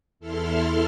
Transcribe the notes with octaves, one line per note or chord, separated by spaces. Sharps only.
E2 E4 A4 C6 F6